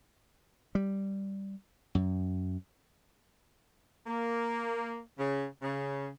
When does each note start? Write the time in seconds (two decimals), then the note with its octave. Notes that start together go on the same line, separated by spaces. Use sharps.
0.75 G3
1.95 F#2
4.07 A#3
5.18 C#3
5.62 C#3